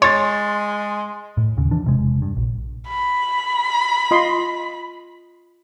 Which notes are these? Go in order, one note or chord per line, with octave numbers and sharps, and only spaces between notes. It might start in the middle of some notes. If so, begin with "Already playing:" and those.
G#3 C#5 C6 A6
A2
D#2 C#3
E3 D4
E1 C3 G#3
G2
A#1
B5
F4 D#5 C6